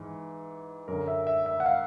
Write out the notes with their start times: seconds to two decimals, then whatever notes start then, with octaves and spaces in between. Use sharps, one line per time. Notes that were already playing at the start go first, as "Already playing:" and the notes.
Already playing: G#2 E3
0.88 F#2 D3 A#4
1.08 E5
1.27 E5
1.46 E5
1.60 F#5
1.66 F5